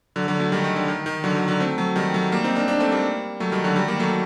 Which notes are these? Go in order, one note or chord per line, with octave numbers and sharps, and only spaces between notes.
D3 F#3
D3 F#3
F#3 A3
D#3 G3
D#3
D3
D#3
D#3
D3 F#3
D#3
D3 F#3
A3 C4
F#3 A3
D#3 G3
F#3 A3
G3 A#3
C4 D#4
A#3 D4
A#3 D4
A3 C4
G3 A#3
F#3 A3
D#3 G3
D3 F#3
D#3 G3
G3 A#3
F#3 A3